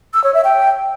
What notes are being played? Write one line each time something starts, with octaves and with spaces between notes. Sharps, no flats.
E6
C#5
E5
G5